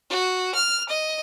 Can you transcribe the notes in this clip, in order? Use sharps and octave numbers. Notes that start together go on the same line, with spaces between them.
F#4
F6
D#5